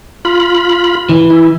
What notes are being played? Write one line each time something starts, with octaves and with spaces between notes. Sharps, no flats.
F4 B5
E3
E4